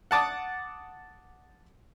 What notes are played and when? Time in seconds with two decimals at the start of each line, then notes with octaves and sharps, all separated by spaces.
0.11 F#5 A5 D6 D#6